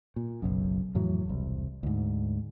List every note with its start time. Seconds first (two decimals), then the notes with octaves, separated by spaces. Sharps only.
0.16 A#2
0.42 F#1 B1 F#2
0.95 F2 A2 E3 F#3
1.26 E1 C2
1.83 D2 G#2